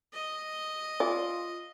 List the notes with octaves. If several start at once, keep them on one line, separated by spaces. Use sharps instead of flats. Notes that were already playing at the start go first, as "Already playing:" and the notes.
D#5
F4 D5